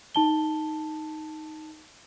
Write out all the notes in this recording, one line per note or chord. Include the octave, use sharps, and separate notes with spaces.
D#4 A5 G7